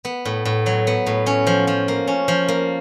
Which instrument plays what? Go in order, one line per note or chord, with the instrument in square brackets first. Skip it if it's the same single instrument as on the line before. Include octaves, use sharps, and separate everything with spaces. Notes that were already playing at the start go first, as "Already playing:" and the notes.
[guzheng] B3
A2
A2
F#3
B3
A2
C#4
F3
F3
A#3
C#4
F3
A#3